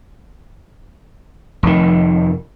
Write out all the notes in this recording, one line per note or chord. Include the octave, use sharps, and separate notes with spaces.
F1 D#3